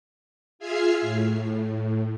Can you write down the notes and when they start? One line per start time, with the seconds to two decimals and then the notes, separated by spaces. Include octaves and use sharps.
0.59 F4 G#4 E5 F6 G#6 C7
1.01 A2